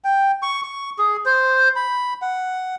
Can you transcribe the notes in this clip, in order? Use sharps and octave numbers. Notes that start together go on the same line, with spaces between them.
G5
C#6
C#6
G#4
C5
B5
F#5